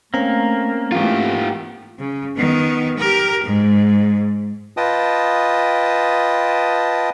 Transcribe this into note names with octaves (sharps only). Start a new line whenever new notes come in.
A3 A#3 C4 C#4 A#5
G#2 E3 A3 F4 G4
C#3
D#3 B3
G4 A#4
G#2
F4 B4 D#5 G5 A5 D#6